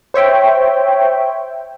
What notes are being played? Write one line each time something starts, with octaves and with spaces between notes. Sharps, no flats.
C5 C#5 E5 G5